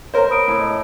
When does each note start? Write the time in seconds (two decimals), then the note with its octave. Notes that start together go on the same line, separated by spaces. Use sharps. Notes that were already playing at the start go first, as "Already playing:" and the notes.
0.14 A#4 C5 C#5 A#5
0.30 B5 D#6 D7
0.48 A2
0.60 D#5